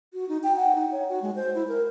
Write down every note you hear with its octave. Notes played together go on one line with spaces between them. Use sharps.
F#4
D#4
G5
F#5
D#4
C#5
F#4
G#3
C5
E4
A#4